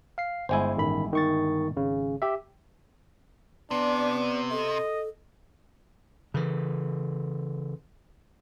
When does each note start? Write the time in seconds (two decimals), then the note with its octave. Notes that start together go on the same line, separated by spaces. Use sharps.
0.18 F5 C7
0.49 G1 G#3 E4 C5 G#5
0.77 A1 D#3 B5
1.13 D#3 C#6 A6
1.76 G#1 C#3
2.22 G4 E5
3.71 C3 B3 D4 D5
4.51 A4 D#5
6.34 C#3 E3